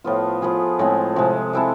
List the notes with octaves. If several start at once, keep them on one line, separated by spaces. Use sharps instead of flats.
A2 F3 B3 F4
F3 B3 F4 G#4
A2 G#3 C4
C3 F3 G#3
G#3 C4 E4 A4